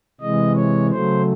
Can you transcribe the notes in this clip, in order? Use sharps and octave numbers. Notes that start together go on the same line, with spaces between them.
C3 E3 G#3 D#5
C#5
C#3 F#3 A3 C5